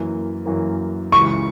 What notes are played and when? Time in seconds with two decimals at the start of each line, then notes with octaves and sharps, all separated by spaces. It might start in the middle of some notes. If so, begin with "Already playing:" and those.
Already playing: F#2 E3 A#3
0.46 F#2 E3 A#3
1.12 C#2 C#3 E3 C#6